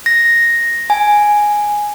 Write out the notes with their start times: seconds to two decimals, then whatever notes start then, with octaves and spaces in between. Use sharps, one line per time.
0.06 A#6
0.90 G#5